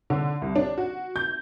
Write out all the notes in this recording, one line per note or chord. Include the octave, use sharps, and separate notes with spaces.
D3
C2
D4
F#4
G6